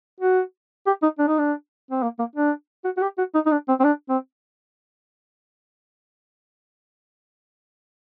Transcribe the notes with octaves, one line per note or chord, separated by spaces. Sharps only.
F#4
G4
D#4
D4
D#4
D4
C4
A#3
A#3
D4
F#4
F#4
G4
F#4
D#4
D#4
D4
C4
C4
D4
C4